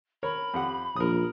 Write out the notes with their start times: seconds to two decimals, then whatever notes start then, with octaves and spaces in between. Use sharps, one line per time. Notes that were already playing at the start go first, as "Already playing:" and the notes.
0.23 A#4 C#5 B5
0.54 F2 G4 F#5
0.96 A#1 A#4 D#6